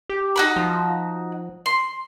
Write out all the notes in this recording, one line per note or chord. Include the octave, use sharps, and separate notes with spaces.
G4
D#4 F#4 B5
F3
C6